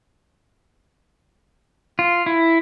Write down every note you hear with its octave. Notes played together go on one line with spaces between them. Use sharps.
F4
E4